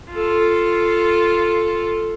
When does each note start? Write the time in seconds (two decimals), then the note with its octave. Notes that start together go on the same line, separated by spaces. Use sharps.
0.11 F4 A4